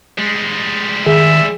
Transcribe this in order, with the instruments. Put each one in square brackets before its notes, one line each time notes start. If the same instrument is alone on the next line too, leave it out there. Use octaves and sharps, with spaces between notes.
[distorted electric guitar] G3 G#3
[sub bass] D#3 [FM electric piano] G#4 [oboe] E5